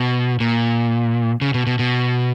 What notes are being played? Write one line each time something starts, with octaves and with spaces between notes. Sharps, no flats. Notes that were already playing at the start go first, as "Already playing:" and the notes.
Already playing: B2
A#2
C#3
B2
B2
B2